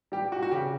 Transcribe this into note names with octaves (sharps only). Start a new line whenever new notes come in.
G3 G4
F#4
F#4
C#3 G4